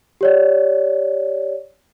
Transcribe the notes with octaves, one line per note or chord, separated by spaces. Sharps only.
G4 C#5 D5